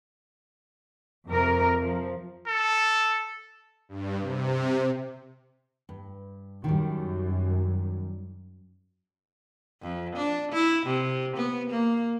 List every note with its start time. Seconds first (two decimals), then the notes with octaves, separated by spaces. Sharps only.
1.26 F2 C3 A#4
1.81 F3
2.48 A4
3.89 G2
4.20 C3
5.89 G2
6.64 F#2 D#3 G3
9.82 F2
10.16 D4
10.52 E4
10.86 C3
11.37 B3
11.70 A#3